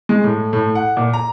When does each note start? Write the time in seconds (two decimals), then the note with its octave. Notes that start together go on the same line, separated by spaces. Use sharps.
0.09 G#3
0.24 A2
0.53 A2
0.75 F#5
0.97 A#2
1.13 A#5